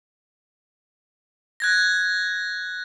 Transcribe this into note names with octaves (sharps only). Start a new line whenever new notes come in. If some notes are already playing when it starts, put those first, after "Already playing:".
F#6 G#6 A#6